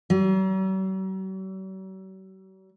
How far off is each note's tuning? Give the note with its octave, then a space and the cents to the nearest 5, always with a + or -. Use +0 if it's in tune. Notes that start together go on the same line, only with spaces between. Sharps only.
F#3 +45